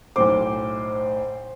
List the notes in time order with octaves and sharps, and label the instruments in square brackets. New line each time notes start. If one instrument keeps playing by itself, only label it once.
[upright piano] B1 A2 D6 [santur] C5